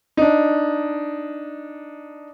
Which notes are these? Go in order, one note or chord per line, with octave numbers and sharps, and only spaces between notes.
D4 D#4